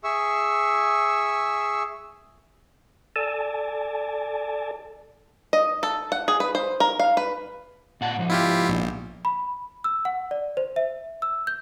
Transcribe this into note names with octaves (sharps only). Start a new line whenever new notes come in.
G#4 E5 C#6 E6
A4 D5 G#5 A5
D#5
A4
F#5
G#4
B4
C5
A#4
F5
B4
A#2 F#5 A5
G#2 F3 D#4
E4 F4 G4
A#1
B5
E6
F#5
D5
C5
E5
E6
G6